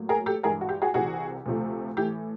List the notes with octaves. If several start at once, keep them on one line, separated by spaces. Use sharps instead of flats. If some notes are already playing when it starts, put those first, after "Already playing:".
Already playing: A2 F#3 A#3
G#4 A#4
G4 A4
G2 E3 G#3 G#4 A#4
F#4
G4
F#4 G#4
C2 C3 E3 F#4 G#4
D2 C3 F3 A3
A2 E3 A3 G4